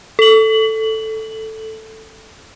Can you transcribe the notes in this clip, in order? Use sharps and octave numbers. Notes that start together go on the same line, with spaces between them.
A4 F#7